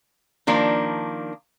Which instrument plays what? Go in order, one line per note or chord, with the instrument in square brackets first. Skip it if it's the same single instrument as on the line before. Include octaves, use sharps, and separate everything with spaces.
[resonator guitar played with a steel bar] D#3 F3 A#3 D4